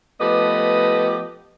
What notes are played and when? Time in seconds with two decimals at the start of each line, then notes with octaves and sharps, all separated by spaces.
0.21 F3 A3 B3 G4 B4 D#5